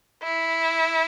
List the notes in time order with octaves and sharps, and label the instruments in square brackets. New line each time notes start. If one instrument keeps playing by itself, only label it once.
[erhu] E4